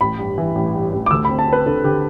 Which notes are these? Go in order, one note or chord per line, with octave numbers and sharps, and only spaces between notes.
A1 B5
G2
E3
A1
G2
A1
D6
D2 E6
C4 B5
A5
C4
B4
D3 A4
D3 G4